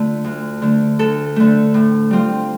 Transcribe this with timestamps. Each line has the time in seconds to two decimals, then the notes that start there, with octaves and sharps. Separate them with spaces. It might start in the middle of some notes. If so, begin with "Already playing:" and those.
Already playing: D3 A3 F4
0.24 D2
0.62 D3 A3
0.99 D2 A4
1.36 D3 A3
1.74 A2
2.11 G3 C4 F4